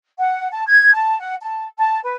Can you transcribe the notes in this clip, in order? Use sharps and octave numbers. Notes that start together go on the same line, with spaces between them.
F#5
A5
G#6
A5
F#5
A5
A5
B4